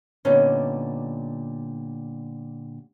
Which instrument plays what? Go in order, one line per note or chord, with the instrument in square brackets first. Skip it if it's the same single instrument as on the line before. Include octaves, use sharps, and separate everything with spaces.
[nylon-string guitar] A#2 D3 G3 B3 C#4 D#4